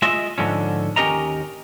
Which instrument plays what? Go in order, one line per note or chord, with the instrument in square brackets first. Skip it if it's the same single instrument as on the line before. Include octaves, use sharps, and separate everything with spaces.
[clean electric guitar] G#3 F4 D#5 E5
G#2 D3 F3 C#4
D#2 C#4 G4 A#4 D#5 A#5